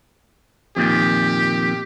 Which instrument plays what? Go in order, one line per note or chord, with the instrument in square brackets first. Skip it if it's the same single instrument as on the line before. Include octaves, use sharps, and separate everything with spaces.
[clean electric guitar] F2 A#2 D#3 [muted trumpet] G4